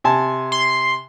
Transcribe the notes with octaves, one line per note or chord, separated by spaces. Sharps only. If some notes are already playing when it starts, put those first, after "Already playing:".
C3 G#5 A5
C6